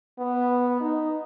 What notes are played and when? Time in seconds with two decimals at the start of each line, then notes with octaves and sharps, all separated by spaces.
0.19 B3
0.80 D#4